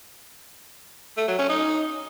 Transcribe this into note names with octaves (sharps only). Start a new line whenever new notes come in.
A3
F#3
C#4
D#4